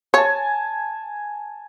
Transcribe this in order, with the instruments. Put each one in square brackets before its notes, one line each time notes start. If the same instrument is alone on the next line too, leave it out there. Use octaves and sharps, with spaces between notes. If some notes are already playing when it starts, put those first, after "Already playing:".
[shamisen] C#5 [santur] G#5 A5